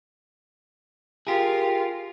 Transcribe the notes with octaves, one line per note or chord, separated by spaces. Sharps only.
F4 G4 G#4 A#4